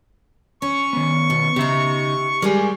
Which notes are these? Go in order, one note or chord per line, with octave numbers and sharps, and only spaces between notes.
C#4 C#6
D#3 B3
B2
C#3 D#4 G4 E5
G3 G#3 A#4 G#5